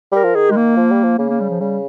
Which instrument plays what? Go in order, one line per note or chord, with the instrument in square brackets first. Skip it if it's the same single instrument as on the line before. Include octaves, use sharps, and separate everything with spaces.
[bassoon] G3 [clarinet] A#4
[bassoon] F3
[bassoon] D#3 [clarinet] G#4
[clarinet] G#3
A#3
[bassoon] F3
G3
F3
[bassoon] C#3 [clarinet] A#3
[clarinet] A#3
G3
F3
[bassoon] C#3 [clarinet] G3